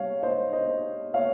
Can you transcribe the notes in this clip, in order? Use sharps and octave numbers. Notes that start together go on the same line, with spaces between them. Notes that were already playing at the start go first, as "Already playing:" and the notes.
Already playing: G3 C#5 F5
C5 D#5
C5 D#5
C#5 F5